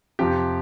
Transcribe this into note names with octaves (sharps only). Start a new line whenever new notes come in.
F2 C3 F3 G4